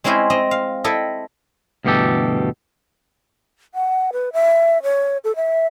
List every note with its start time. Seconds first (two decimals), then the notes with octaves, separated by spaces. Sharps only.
0.04 G#3 C4 C#4 E4 C5 D#5
0.30 C4 D#5
0.51 F5
0.84 E4 A4 D#5 G5
1.85 D2 G2 B2 E3 G4 A4
3.74 F#5
4.13 B4
4.33 E5
4.83 C#5
5.24 A4
5.36 E5